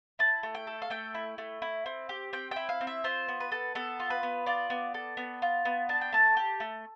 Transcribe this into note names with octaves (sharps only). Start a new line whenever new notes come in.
E4 A5
A3
G5
A4
F5
A3 G5
E4
A3
E4
C4
G4
C4 G5
E4 G5
F5
C4
E5
F4 C5
B3
B4
A4
B3 A4
F4
B4
B3
F4 D5
B3
A4
B3
F4
B3
D4 A5
G5
A3 A5
G4
A3